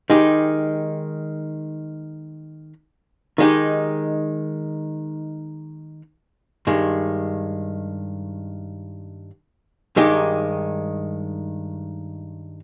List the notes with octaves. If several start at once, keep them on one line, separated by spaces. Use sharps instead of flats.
D#3 G#3 D#4 G4
D#3 G#3 D#4 G4
G2 D#3 G#3
G2 D#3 G#3 D#4 G4